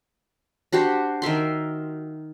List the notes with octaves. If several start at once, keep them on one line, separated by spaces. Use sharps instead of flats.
D4 F#4 G4 C5
D#3 A#4 E5 C6